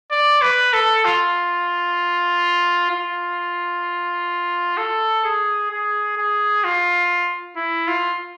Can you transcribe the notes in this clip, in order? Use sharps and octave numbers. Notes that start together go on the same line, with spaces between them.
D5
B4
A4
F4
F4
A4
G#4
G#4
G#4
F4
E4
F4